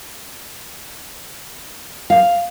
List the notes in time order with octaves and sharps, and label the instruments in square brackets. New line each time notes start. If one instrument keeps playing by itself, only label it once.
[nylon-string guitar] F5